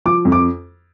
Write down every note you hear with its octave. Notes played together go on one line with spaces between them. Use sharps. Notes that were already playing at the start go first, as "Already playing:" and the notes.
F3 D6
F2
D6